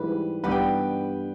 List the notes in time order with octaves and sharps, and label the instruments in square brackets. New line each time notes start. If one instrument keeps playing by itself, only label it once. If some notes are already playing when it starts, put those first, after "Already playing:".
Already playing: [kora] G#2 E3 G3 [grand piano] B4
[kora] G2 G3 B3 G4 [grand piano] B4
[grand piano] G5